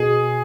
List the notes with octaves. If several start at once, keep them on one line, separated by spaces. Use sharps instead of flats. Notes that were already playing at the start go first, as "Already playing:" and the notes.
Already playing: B2 G#4